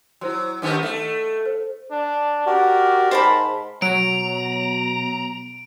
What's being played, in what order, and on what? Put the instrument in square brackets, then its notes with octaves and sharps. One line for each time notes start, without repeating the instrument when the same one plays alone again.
[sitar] F#3 [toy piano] E4 C5 C6
[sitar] F#2 D#3 B3 [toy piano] D#4 C5 C#5
[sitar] A3
[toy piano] C5
[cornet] D4
[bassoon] F#4 [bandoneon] G4 D5 [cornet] A#4
[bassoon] G#2 [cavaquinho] C5 A5 B5
[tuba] B2 [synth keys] F#3 [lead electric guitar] A#5 [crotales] D7